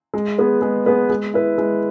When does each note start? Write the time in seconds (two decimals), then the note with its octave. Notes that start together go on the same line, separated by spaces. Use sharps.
0.14 G#3
0.38 B3 G#4 B4
0.62 G#3
0.86 B3 G#4 B4
1.10 G#3
1.34 E4 B4
1.58 G#3